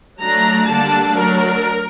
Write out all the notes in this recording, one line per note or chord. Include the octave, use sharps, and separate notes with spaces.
F#3 A3 D4 A#5
D3 G3 A#3 D4 A5
F#3 A3 D4 A#4